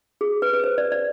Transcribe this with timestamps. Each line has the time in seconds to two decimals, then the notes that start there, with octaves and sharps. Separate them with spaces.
0.21 G#4
0.42 B4
0.53 B4
0.64 C5
0.78 D5
0.92 D5